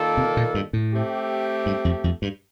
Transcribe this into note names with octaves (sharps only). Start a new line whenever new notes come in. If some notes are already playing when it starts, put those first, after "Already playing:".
Already playing: D#3 A#3 F4 A4 D5
C3
A#2
G2
A2
A3 C4 G4
G2
F2
F2
G2